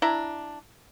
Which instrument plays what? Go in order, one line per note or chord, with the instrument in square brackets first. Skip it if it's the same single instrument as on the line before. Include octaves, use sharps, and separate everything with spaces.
[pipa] D4 E4 A#5